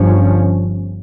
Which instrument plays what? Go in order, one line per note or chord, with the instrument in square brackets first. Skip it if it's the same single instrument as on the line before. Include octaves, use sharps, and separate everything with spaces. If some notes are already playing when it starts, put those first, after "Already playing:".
Already playing: [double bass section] G1 G2 F3 C#4